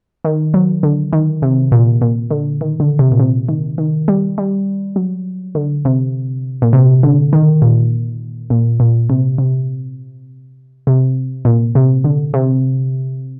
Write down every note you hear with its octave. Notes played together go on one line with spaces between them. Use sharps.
D#3
F#3
D3
D#3
C3
A#2
A#2
D3
D#3
D3
C3
A#2
C3
D#3
D#3
G3
G3
F#3
D3
C3
A#2
C3
D3
D#3
A#2
A#2
A#2
C3
C3
C3
A#2
C3
D3
C3